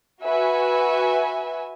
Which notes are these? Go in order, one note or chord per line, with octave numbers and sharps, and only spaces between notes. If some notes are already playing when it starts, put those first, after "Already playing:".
F#4 B4 E5 G#5